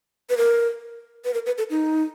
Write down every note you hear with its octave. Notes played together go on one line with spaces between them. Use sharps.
B4
A#4
B4
A#4
B4
A4
D#4